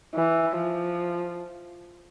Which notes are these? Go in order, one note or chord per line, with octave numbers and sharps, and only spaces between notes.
E3
F3